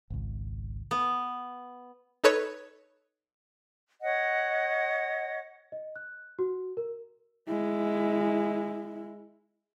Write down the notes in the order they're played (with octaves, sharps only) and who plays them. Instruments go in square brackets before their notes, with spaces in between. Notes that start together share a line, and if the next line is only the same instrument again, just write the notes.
[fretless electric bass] G#1 C#2
[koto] B3
[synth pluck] D#4 A4 B4 C#5
[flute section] C#5 D#5 F#5
[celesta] D#5
F#6
F#4
A#4
[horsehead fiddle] G#3 E4